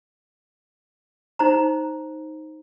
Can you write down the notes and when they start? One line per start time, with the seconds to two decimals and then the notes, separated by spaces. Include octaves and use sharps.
1.39 D#4 C5 A#5